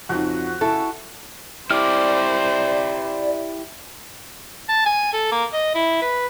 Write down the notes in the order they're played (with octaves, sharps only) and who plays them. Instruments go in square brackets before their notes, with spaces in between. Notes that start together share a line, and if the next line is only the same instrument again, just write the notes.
[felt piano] F2 [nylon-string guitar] C#3 C4 D#4 [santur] F#4
[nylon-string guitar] C#3 C#4 [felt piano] E4 [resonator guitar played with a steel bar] A4
[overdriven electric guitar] E4 G4 [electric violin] C5 [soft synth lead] D5 [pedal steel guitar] D6 F6
[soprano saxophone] A5
G#5
A4
A#3
D#5
E4
B4